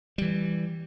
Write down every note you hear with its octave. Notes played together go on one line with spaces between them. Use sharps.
E3 G3